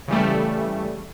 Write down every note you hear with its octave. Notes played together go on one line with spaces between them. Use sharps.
C#3 E3 G3 A3